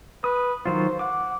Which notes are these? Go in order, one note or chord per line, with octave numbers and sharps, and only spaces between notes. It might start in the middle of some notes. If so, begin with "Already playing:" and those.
B4 D#6
D#3 F#3 F4 C5
F#5 D6